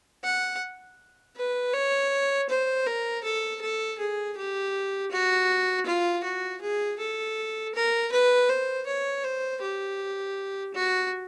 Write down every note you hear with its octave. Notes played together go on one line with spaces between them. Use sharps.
F#5
B4
C#5
C5
A#4
A4
A4
G#4
G4
F#4
F4
F#4
G#4
A4
A#4
B4
C5
C#5
C5
G4
F#4